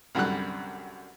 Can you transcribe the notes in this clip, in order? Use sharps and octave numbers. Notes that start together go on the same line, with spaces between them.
C2 F#2 D3 G3 F#6